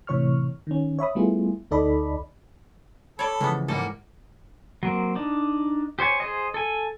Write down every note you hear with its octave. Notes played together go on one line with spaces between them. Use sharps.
A2 C3 E3 C#5 C#6 F6
D#3 C#4
C#5 E5 B5 D#6
G3 A3 B3 E4 F4 G#4
D2 D#4 A4 D5 D#5 B5
A4 C#5 D5 B5
C#3 E3 F3 G#3 B3
G#2 G3 A#3 A4 D#5 F#5
F#3 A#3 C4
D4 D#4
G4 C5 C#5 G#5
G#4 C5 D#5
A4 G#5